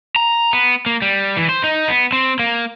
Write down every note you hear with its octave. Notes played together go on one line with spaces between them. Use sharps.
A#5
B3
A#3
G3
E3
C5
D#4
B3
C4
A#3